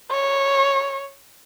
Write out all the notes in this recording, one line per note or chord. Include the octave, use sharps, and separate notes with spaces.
C#5